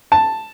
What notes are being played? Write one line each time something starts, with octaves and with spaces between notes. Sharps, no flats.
A5